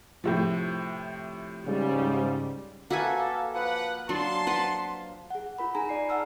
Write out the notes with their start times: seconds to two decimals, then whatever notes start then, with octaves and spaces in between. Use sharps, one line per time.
0.24 A2 C3 F3
1.66 G#2 C#3 G3
2.90 A#3 F#4 A4 B4 E5 F5 G#5
3.54 F3 B4 F#5
4.09 F#3 D4 A5 C6
4.47 B4 F#5
5.30 G#4 F#5
5.58 F4 A#4 B5
5.75 D#4 G#4 G#5 A#5
5.89 D5 C7
6.09 F#5 A5 E6 F6